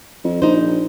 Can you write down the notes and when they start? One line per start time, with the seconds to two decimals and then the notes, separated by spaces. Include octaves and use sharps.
0.24 F2
0.42 A#1 D#4 C5